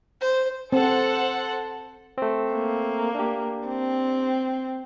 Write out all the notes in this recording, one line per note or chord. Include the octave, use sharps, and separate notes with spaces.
C5
C4 A4 C5 F#5
A3 C4
A#3
D4 G4
C4